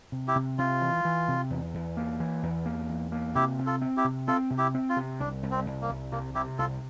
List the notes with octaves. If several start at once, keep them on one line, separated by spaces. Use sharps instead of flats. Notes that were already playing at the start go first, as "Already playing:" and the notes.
C3
E4 G4
C3
C3 F4
E3
E3
C3
E2
E2
A#3
E3
E2
A#3
E2
A#3
C3 E4 G4
C3
F4 A4
C4
E4 G4
C3
C4 F4 A4
C3
E4 G4
C4
F4
C3
C2 D4
C2
C4
C2
A#3
C2
C3 A#3
C3 E4 G4
C2 F4 A4